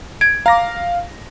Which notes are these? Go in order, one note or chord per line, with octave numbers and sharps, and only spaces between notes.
G#6 D7
F5 A#5 D6 A#6